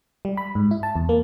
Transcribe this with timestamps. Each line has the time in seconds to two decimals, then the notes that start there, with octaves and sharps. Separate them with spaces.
0.25 G3
0.37 B5
0.55 G#2
0.71 E4
0.83 A5
0.96 E2
1.09 A#3